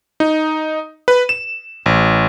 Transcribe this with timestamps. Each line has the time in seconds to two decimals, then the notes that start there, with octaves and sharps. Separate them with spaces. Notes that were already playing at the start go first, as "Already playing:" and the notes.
0.20 D#4
1.08 B4
1.29 E7
1.86 A1